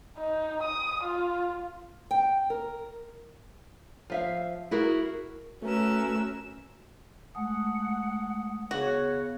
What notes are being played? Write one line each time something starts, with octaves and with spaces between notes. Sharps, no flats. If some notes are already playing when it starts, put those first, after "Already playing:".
D#4
D#6
F4
G5
A#4
F3 E5 F5
E4 F#4 G#4 A#4
A3 C#4 F#4 A#4 B4 G#5 E6
G#3 A3 F#5 D#6
C#3 B3 F#4 C#5